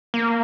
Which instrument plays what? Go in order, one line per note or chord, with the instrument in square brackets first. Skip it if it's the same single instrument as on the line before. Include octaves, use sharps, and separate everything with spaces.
[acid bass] A#3